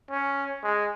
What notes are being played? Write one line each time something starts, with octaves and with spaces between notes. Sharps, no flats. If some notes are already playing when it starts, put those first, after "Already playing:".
C#4
G#3